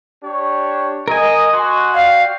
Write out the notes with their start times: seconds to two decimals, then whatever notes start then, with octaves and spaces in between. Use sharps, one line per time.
0.23 D4 G4 C#5
1.08 A#4 D#5 G#5
1.53 F#4 D#5 G#5 C6
1.94 D5 F5 G5